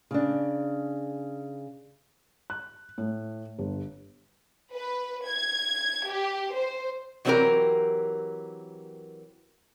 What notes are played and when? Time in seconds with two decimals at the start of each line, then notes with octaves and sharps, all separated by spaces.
0.11 C#3 D4
2.50 F#6
2.98 A2
3.59 G1
4.75 B4
5.28 G#6
6.11 G4
6.55 C5
7.25 E3 F#3 C4 D4 G4 A#4